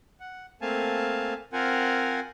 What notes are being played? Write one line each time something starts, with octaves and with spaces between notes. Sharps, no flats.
F#5
A3 A#3 C4 F5 G#5 A5
C4 F4 A#4 C5 F#5 G#5